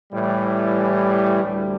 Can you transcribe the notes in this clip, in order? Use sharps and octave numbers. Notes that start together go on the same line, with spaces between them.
A2 E3 G3
D2 D3 G3